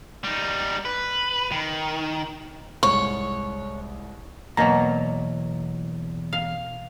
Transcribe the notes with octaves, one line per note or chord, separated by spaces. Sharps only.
G3 D#4
B4
D#3
C2 G#2 C#5 C#6
E2 B2 F#3 A#3 A#5
F5